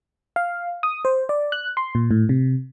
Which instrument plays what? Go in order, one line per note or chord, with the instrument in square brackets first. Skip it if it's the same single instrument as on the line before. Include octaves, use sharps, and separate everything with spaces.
[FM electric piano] F5
D#6
C5
D5
F#6
C6
A#2
A2
C3